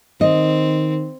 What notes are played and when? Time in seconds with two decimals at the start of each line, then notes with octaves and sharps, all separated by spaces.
0.21 D#3 C4 D#5